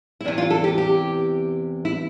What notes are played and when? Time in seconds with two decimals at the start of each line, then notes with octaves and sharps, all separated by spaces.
0.20 E4
0.25 E2 C3 E3 D4
0.38 F4
0.50 A4
0.64 G4
0.78 G4
1.85 E4